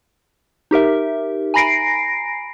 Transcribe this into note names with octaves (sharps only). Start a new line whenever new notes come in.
D#4 G4 A#4 E5
G#5 A#5 B5 A#6 C7 D7